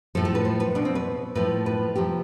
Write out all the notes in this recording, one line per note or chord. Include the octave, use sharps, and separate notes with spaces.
A2 F3 A4
A4
B4
C5
B4
B2 D4
C4
B4
A2 F3 B4
B4
C3 F3 G4